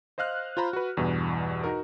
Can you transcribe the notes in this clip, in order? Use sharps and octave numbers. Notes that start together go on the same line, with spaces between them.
C5 D#5 F5 F6 F#6
F4 C5 A#5 B5
F#4 B4
E2 G2 B2 E3
D#4 F#4 A#4